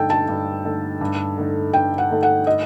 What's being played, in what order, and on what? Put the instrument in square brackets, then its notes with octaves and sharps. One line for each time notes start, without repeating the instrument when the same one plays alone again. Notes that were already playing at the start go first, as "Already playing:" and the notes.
Already playing: [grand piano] G2 D3 A3 D#4 A4 [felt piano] G5
[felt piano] A5
[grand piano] G2
D3 A3 D#4 A4
G2
D3 A3 D#4 A4
[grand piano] G2 [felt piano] G5
[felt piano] F#5
[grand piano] D3 A3 D#4 A4
[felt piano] F#5
D#5